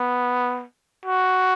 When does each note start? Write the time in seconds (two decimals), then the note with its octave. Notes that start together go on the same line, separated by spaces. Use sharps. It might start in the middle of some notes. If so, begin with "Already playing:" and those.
Already playing: B3
1.06 F#4